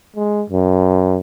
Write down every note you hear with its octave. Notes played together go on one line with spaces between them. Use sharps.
G#3
F#2